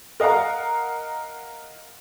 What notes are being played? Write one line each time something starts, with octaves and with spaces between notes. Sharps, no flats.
A#4 D#5 F5 F#5 A#5